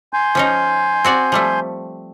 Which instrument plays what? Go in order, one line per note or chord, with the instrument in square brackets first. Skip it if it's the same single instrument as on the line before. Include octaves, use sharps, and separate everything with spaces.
[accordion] G#5 C6 G6
[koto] F3 C#4 D#4
C4 F#4 D5
F3 G3 A3